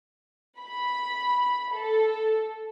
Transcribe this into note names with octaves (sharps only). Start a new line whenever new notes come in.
B5
A4